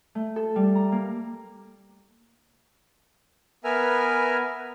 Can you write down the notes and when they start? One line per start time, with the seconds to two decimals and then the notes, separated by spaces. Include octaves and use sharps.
0.15 A3
0.36 A4
0.56 G3
0.75 A#5
0.92 A#3
3.64 B3 A#4 B4 E5 G#5 F6